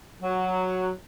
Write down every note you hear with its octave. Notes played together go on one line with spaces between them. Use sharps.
F#3